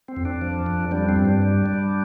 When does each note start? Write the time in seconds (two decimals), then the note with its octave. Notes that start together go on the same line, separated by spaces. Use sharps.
0.08 C4
0.16 F2
0.25 D4
0.41 F3
0.66 F2
0.91 G3 D4
1.09 C4
1.16 G2
1.25 D4
1.42 G3
1.66 G3